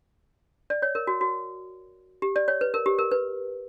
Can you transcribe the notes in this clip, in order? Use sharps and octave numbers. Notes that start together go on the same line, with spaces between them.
D5
C#5
A#4
F#4
F#4
G4
D5
C#5
B4
A#4
G4
A#4
B4